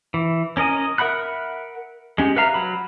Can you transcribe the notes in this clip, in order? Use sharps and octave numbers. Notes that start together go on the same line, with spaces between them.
E3
C#4 A#4 D#5 G#5
A#4 E5 F#5 B5 F#6
G#3 C#4 G4
B4 E5 F5 A#5
F#3 B5